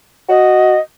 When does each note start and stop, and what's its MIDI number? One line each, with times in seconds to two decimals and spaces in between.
0.29 0.76 66
0.29 0.79 75